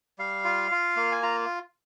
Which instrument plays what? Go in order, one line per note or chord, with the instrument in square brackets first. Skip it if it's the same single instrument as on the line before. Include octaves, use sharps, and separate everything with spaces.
[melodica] G3 F5
F4
F4
A#3
G#5
F4 A#5